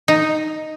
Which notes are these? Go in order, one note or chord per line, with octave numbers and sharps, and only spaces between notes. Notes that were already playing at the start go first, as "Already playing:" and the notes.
D#4